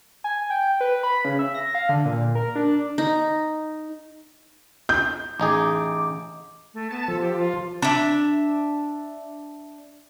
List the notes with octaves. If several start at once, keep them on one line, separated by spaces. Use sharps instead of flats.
G#5
G5
B4
B5
C#3
E5
A#6
F5
D3
A#2
A#4
D4
D#4
G6
A1 D#4 G#4 D6
A3
B3 A5
F3 A4
G4
F4
D4 E5